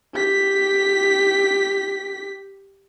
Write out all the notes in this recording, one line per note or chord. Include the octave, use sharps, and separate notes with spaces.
G4 B6